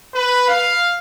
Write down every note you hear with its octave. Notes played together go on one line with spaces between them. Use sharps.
B4
F5